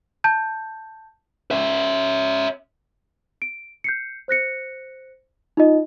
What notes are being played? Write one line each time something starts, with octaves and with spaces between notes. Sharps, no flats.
A5 G6
C#4 E5
D7
G6 C7 C#7
C5 F#6 A#6 C#7
D#4 F4 D#5